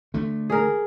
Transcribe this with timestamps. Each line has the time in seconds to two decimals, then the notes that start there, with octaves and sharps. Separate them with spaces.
0.14 D3 A3
0.50 G#4 A#4